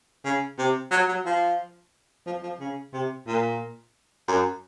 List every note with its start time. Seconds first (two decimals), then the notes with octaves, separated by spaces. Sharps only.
0.24 C#3
0.58 C3
0.91 F#3
1.08 F#3
1.25 F3
2.26 F3
2.43 F3
2.60 C#3
2.93 C3
3.27 A#2
4.28 F#2